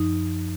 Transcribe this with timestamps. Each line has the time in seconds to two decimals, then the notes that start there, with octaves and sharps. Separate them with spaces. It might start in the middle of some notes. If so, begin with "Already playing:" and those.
Already playing: F#2 F3 D#4